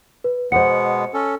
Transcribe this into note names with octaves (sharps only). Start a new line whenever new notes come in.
B4
B2 G#3 B3 C5 F#5 C#7
C#4 A4